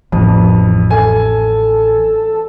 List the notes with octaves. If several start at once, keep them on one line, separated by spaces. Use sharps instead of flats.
A1 F2 E3
A4 G#5